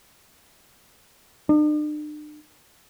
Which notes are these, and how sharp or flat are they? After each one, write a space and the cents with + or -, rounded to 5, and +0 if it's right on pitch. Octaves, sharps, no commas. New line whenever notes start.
D4 +45